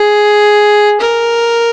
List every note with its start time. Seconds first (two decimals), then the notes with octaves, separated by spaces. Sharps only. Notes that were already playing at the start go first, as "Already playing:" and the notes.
Already playing: G#4
1.00 A#4